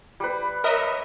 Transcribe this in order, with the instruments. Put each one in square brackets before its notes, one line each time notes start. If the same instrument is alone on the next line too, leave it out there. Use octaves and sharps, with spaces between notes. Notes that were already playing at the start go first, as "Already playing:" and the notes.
[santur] G3 B4
[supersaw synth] A#4 D#5 E5 [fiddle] C#5